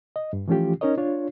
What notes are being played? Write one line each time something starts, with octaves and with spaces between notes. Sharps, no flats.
D#5
G2
E3 F3 A3 C#4 F4 G4
C#4 D#4 A#4 C#5 D#5
D4 F4 C#5